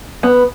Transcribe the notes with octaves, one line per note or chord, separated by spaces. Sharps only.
B3